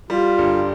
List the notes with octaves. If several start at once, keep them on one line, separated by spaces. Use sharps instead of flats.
G3 F4
G1